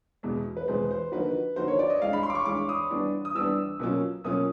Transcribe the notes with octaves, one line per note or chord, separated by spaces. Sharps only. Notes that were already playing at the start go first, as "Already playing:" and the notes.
E2 B2 G#3
B4
E2 B2 G#3 C5
C5
D3 F3 A#3 D#4 F#4 B4
D3 F3 A#3 D#4 F#4 C5
C#5
D5
D#5
G2 E3 G#3 F5
B5
C6
D6
C#6
G2 E3 G#3 D6
D#6
E3 G3 B3 D4
D#6
E3 G3 B3 D4 E6
B2 F#3 A#3 C#4 F4
B2 F#3 A#3 C#4 F4 D#6